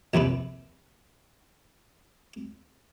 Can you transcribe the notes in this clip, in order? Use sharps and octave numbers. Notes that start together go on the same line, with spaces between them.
A#1 D#2 C3 B4